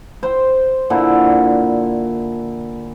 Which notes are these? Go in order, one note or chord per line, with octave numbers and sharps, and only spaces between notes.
C5 G5
A#2 D3 E4